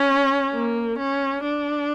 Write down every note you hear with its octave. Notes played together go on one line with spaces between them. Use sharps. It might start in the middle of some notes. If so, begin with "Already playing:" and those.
Already playing: C#4
A#3
C#4
D4